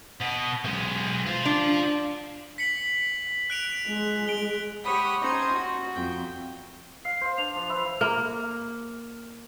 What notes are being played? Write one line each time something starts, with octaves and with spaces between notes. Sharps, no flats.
B2
B1 G#3
F4 C5
D4
B6 C#7 F#7
F#6 D7 F7
G#3
D7 G7
G4 C#5 F#5 B5 D#6
C#4 D#4 C5 D#5 G#6
F#4
F2 G5
F5 C7
C5 F5
D4 F7
F3
E3 B4 E5
A#3